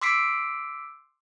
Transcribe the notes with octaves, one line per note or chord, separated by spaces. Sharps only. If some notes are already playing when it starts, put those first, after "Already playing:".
C6 D6 E6 B6 C7 D7